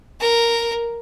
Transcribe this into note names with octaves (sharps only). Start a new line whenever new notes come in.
A#4